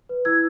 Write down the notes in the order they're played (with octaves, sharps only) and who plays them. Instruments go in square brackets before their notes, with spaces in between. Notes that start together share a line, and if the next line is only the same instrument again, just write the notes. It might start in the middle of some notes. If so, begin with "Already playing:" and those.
[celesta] B4
E4 E6 G#6